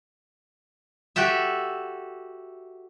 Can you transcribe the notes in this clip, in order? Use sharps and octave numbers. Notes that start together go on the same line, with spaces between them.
F#4 G4 A4 E5